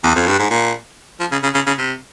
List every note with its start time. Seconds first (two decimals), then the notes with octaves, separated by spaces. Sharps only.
0.04 E2
0.15 F2
0.27 G2
0.39 G#2
0.50 A#2
1.20 F3
1.31 C#3
1.43 C#3
1.54 C#3
1.67 C#3
1.78 C3